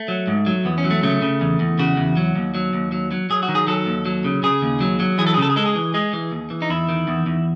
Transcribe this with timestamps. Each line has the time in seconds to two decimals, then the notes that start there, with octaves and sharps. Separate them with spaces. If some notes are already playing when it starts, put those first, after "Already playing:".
Already playing: A3
0.08 F#3
0.27 G#2
0.46 F#3
0.65 E2 B3
0.78 C#4
0.84 F#3
0.91 A3
1.03 C#3 A3
1.22 C#3
1.41 E2
1.60 E2
1.79 C#3 F#4
1.97 E2
2.17 F#3
2.36 D#2
2.55 F#3
2.73 D#2
2.92 F#3
3.11 F#3
3.30 F#3 G#4
3.43 F#4
3.49 D#3
3.55 G#4
3.67 F#3 A4
3.86 D#2
4.05 F#3
4.24 C#3
4.43 C#3 G#4
4.62 D#2
4.81 F#3
5.00 F#3
5.18 E3 G#4
5.27 A4
5.34 G#4
5.37 C#3 A4
5.50 G#4
5.56 G#3 A4
5.66 G#4
5.75 E3
5.94 G#3 G#4
6.13 E3
6.32 D#2
6.50 E3
6.62 D#4
6.70 E2 E4
6.89 D#3
7.08 E2
7.26 E2